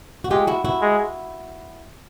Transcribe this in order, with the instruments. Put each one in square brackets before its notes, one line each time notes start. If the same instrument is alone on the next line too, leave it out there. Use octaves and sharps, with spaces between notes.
[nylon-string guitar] F#4
[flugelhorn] G#3 [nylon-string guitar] F4 G4
[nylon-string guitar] E4 F#4
E4 F#4
[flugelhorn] G#3